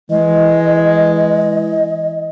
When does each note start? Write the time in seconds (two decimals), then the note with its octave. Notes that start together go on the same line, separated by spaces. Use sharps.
0.10 E3 G#3 D#5